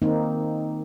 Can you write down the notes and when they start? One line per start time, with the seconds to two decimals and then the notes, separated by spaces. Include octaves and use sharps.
0.02 D#3 A#3 C4 D#4